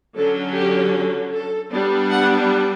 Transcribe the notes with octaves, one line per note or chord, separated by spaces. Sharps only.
D3 F#3 C#4 A4
G4
A4
G3 B3 D4
F#5